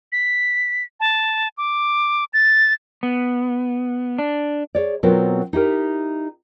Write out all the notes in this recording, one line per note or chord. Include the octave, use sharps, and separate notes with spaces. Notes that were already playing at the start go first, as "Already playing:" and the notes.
B6
A5
D6
A6
B3
D4
G#4 C#5 D5
B2 F#3 B3 C4 F4 A#4
D#4 E4 G4 A#4